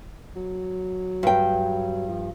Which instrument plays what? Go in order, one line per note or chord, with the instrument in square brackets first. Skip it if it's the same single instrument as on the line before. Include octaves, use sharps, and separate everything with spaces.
[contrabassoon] F#3
[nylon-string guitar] G2 G5
[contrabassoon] F3